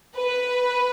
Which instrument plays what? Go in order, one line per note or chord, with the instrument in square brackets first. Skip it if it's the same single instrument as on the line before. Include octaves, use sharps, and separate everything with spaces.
[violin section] B4